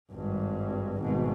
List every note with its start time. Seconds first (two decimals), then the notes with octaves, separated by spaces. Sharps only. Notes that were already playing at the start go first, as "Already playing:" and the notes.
0.11 G#1 G2
0.99 G#1 B2